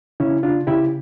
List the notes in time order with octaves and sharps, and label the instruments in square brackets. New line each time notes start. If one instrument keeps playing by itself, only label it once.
[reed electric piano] C#3 C#4 E4
D4 F4
C#3 E4 G4